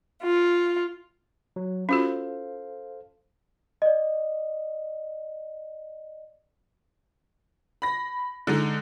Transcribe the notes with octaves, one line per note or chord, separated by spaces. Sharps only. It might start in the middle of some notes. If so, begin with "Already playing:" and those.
F4
F#3
C#4 F4 F#4 A4 C5 F5
D5 D#5
B5 A#6
D3 G#3 D#4